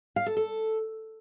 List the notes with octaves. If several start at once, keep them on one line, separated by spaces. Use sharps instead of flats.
F5
A4
A4